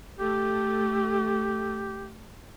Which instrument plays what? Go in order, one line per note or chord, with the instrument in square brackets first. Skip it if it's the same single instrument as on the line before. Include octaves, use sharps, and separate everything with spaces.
[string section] A3 [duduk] G4